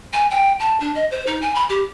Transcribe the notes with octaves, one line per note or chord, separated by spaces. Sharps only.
G#5
G5
A5
D4
D#5
C5
D#4
G#5
B5
G4